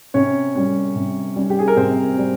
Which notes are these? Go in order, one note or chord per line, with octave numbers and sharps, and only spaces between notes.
C3 C#4 C#5
G3 C#4
C3
G3 C#4
G4
G#4
A#4
C3 C4 C5
G3